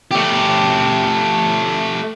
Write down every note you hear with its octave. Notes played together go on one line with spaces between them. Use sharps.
A3 G4